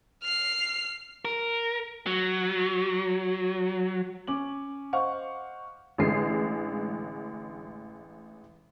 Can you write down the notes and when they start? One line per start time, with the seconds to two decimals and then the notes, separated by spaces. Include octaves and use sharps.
0.22 F6 C7
1.25 A#4
2.07 F#3
4.27 C#4 D6 F#7
4.93 C5 D#5 F5 F#5 C#6
5.98 A1 D3 G#3 C7